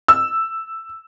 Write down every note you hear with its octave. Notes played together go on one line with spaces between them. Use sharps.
E6